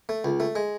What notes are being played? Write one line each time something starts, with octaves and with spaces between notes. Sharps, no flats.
A3
C#2
A3
G#3